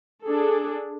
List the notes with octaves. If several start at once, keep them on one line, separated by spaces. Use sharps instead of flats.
D4 G#4 A4